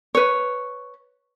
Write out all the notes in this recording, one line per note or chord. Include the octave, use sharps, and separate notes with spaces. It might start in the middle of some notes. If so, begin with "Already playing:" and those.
B4 C#5